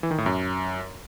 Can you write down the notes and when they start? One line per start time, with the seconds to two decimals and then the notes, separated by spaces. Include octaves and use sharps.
0.03 E3
0.11 D#3
0.18 A2
0.26 F#2